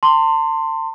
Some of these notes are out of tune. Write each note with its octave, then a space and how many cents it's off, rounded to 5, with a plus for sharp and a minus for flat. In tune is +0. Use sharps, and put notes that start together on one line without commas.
A5 +35 C6 +0